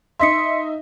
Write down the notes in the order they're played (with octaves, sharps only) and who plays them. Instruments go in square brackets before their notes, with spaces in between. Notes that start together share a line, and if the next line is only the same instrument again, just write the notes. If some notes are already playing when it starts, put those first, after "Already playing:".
[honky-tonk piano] D#4 D#5 E5 [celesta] C6 B6 C#7